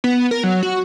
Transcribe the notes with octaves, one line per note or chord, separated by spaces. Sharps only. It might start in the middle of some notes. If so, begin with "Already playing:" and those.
B3
A#4
F#3
F#4